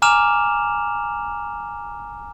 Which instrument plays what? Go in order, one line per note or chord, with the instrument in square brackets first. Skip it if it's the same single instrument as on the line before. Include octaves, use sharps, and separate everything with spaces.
[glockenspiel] G#5 A#5 D6 F6 E7 F7